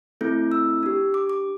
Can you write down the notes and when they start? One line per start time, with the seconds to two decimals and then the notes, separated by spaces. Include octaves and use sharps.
0.21 A3 C4 E4 A4 G6
0.52 E6
0.83 D4 G4
1.14 D6
1.30 D6